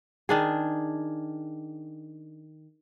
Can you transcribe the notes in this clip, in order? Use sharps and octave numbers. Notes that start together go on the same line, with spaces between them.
D#3 D4 G#4